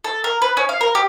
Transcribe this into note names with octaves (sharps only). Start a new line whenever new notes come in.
A4
A#4
B4
C#4
F5
A#4
G4